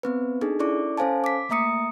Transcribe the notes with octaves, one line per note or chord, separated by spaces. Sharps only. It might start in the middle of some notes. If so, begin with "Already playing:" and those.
B3 C4 B4
D4 D#4 G#4 A4
C#4 E4 A4 D5 C#6 D6
C#4 A4 C5 F5 G#5 A5
D6 B6
A3 A#3 E5 A#5 D#6 C#7